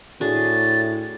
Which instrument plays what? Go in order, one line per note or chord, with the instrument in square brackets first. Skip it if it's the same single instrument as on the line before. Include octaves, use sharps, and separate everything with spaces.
[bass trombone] A2 [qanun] D4 F#4 G#4 [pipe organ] A6